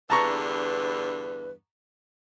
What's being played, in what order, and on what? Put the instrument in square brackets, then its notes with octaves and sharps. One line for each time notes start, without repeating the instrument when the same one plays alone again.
[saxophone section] E2 G2 D3 [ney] B4 [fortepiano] A5 A#5 C#6